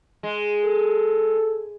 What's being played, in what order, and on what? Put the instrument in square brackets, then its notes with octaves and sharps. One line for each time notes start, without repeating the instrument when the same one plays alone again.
[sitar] G#3
[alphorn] A4